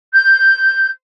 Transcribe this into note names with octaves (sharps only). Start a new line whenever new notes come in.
G6